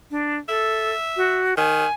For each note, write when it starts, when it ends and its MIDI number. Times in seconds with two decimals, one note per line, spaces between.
0.11 0.37 62
0.49 0.93 69
0.49 1.44 76
1.17 1.57 66
1.57 1.85 51
1.57 1.93 80